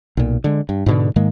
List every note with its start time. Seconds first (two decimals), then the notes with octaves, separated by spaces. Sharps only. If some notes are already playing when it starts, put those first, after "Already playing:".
0.17 B1 A#2
0.44 D3 G#3
0.69 G2
0.86 G#2 B2 D3
1.16 G#2 D#3 G#3 A#3